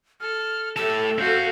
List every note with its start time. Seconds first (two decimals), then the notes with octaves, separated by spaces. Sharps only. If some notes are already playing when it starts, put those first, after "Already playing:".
0.20 A4 F6
0.77 A2 G4 A4 E5 A5 E6
1.19 C4 F#4 F5 G6